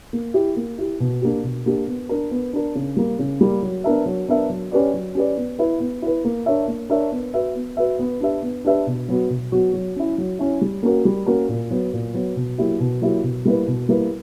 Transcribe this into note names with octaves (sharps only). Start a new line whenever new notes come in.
A#3
E4 G4
A#3
E4 G4
B2
A#3 D4 G4
B2
A#3 D4 G4
B3
D4 A#4
B3
D4 A#4
C#3
G3 A#3
C#3
G3 A#3
F#3
B3 D4 A#4 E5
F#3
B3 D4 A#4 E5
F#3
C#4 G4 B4 D5
F#3
C#4 G4 B4 D5
B3
E4 B4
B3
E4 B4
A#3
D4 A#4 C#5 E5
A#3
D4 A#4 C#5 E5
B3
F#4 B4 E5
B3
F#4 B4 E5
B3
D4 G4 B4 E5
B3
D4 G4 B4 E5
B2
F#3 B3 F#4
B2
F#3 B3 F#4
F#3
C#4 E4
F#3
C#4 E4
G3
A#3 C#4 F#4 A#4
G3
A#3 C#4 F#4 A#4
A#2
F#3 B3
A#2
F#3 B3
B2
F#3 A#3 E4 G4
B2
F#3 A#3 E4 G4
B2
G3 A#3 E4 B4
B2
G3 A#3 E4 B4